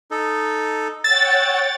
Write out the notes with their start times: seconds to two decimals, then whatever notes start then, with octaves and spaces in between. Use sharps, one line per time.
0.11 D#4 A4
1.04 C#5 F#5 G5 E6 A6